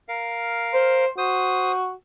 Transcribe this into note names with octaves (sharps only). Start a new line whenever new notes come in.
A#4 F5
C5
F#4 C5 D#6